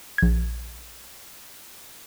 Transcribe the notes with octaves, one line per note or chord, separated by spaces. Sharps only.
A#1 G#6